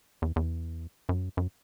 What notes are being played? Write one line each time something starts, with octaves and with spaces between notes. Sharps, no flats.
E2
E2
F#2
F#2